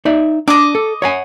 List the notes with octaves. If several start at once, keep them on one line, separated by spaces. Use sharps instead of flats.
D#4 D5 E5
D4 D5 D#5 D6
A4
C#5 F#5 G#5